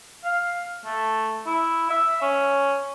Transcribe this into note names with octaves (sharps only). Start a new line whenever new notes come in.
F5
A3
E4
E5
C#4